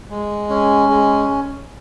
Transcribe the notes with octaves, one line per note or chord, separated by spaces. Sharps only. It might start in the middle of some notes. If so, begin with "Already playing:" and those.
G#3
C#4
G#3